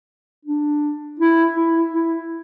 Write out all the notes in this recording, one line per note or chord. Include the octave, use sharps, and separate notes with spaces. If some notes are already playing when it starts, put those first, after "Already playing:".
D4
E4
E4
E4